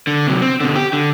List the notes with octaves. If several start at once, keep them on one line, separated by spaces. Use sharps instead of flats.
D3
C3 F#3
C4
B2 D3
G4
D3